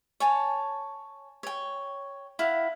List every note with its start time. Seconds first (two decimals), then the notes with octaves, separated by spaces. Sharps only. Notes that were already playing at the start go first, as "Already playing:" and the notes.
0.20 C#5 G#5 A5
1.43 C#5 G5
2.39 E4 F5 F#5